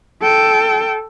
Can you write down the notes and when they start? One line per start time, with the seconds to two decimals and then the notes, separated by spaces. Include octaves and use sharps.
0.22 A4 G5